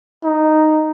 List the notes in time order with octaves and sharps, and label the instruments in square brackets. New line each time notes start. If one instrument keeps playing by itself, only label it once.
[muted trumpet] D#4